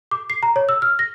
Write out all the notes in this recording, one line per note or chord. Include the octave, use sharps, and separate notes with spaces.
D6
C7
A#5
C#5
E6
F6
A#6